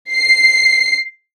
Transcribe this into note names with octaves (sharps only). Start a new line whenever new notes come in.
C7